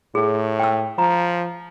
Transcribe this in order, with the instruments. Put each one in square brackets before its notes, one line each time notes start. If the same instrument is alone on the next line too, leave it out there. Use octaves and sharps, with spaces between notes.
[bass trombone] A2 [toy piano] G#4
[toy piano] G5 E6
[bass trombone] F3 [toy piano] A#5